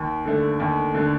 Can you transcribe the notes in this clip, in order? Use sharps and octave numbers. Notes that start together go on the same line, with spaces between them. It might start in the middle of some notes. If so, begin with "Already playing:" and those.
Already playing: D#2
D3 A3
D#2
D3 A3